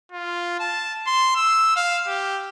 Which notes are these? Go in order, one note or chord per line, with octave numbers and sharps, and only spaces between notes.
F4
A5
C6
E6
F5
G4